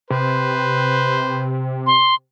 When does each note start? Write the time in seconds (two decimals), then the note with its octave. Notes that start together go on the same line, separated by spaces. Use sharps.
0.10 C3 B4 C5
1.87 C6